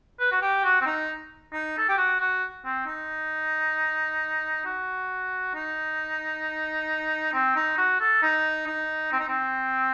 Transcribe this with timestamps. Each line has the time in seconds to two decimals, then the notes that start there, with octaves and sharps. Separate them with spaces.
0.20 B4
0.32 F#4
0.41 G4
0.64 F#4
0.81 C4
0.86 D#4
1.53 D#4
1.78 A4
1.88 G4
1.98 F#4
2.20 F#4
2.65 C4
2.86 D#4
4.65 F#4
5.55 D#4
7.33 C4
7.56 D#4
7.78 F#4
8.00 A4
8.22 D#4
8.67 D#4
9.12 C4
9.20 D#4
9.28 C4